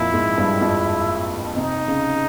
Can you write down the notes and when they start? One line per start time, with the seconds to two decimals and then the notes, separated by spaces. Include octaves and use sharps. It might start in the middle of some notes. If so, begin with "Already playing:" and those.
Already playing: F2 A#2 F3 A#3 E4
0.14 G#2 G#3
0.37 G2 G3
0.61 F2 F3
1.56 C3 D#4
1.88 C#3